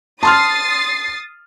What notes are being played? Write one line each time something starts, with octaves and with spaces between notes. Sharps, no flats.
A5 C6 D#6 F6 A6 C7